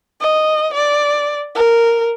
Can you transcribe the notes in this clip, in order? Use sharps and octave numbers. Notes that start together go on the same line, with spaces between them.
D#5
D5
A#4